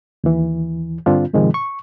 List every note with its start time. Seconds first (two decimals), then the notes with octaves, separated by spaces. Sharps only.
0.24 D#2 E3
1.06 G2 D3 C4 D4 F4
1.33 G#2 C3 D#3 F3 G#3
1.54 C#6